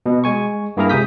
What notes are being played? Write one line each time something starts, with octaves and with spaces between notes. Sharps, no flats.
B2
G#3 G#5 C#6
G2 A#3 E4 G#4 A#4 A#5
C#2 C3 G#4 D#6 G6 B6